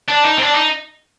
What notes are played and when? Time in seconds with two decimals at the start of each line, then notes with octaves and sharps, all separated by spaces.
0.08 D4
0.25 D#4
0.38 C4
0.43 D4
0.55 D#4